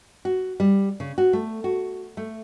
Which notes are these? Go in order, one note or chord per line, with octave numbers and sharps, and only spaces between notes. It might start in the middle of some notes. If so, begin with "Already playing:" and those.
F#4
G3
C#3
F#4
A3
F#4
A3